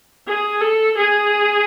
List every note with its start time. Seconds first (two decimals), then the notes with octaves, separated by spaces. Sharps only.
0.27 G#4
0.61 A4
0.97 G#4